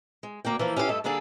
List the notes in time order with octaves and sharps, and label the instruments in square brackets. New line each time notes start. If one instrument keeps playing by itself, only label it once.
[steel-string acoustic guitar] G#3
D2 A#3 D5 G5
E3 F3 A#3
C#4 G4 A4 B4 F5
G2 A3 A4 D#5 E5
D3 G3 A#3 D4 G#4 A4